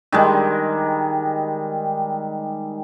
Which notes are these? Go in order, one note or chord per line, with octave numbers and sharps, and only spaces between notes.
D#3 G3 G#3